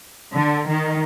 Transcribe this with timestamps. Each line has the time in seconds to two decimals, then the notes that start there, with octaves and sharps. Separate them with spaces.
0.34 D3
0.67 D#3